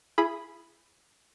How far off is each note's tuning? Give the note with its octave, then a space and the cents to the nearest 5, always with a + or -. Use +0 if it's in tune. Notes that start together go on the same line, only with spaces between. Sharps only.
E4 +30 G#4 +0 B5 +0